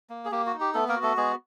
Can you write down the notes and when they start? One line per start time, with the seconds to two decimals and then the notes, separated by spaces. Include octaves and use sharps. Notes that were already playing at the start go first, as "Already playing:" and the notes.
0.10 A#3
0.25 G#4
0.32 A#3 G4
0.46 F#4
0.54 D#4
0.60 G4
0.74 A3 B3 A4
0.88 A#3 A#4
0.96 F#4
1.02 A3 A4
1.17 G#3 B3 G#4